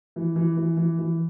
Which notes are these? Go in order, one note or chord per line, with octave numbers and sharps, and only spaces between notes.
E3
E3
E3
E3
E3